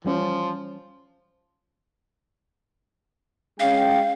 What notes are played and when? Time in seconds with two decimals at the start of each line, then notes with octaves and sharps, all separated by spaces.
0.05 E3 F3 G3 C#4
3.60 G#3 C#4 F5 G5